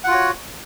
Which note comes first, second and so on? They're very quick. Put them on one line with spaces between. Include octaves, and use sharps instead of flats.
F#5 F4 F#4 C#5